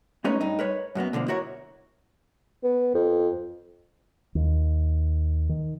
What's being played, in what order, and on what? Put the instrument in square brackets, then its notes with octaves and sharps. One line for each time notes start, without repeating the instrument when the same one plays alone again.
[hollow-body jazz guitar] G#3 A3 C#4 D#4 B4 C#5
G2 D#4
A#4 B4 C#5
F#2 F#3 A#3 B3
B2 D3 F3 A#3
E4 F#4 A#4 C#5
[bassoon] B3
F2
[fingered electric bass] D#2
D#3